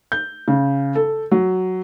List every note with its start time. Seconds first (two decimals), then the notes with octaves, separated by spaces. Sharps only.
0.12 G6
0.48 C#3
0.95 A4
1.31 F#3